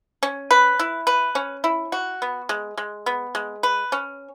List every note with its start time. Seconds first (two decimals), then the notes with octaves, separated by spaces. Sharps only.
0.23 C#4
0.51 B4
0.79 E4
1.07 B4
1.35 C#4
1.64 E4
1.92 F#4
2.22 B3
2.49 G#3
2.77 G#3
3.06 B3
3.35 G#3
3.63 B4
3.92 C#4